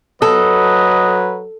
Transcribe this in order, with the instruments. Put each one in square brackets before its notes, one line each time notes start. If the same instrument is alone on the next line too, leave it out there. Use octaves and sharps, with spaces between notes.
[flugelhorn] F#3 [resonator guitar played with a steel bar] A4 [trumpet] B4 [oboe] D#5